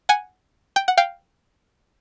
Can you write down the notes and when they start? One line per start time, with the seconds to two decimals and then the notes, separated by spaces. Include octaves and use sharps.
0.09 F#5 G#5
0.76 G5
0.88 F#5
0.97 F5 G5